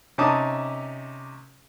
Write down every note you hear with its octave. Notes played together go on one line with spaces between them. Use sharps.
C3 C#4 D#4 A5 D6 D#6